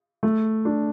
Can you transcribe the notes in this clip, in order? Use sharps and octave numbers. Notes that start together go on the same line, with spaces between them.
A3
D4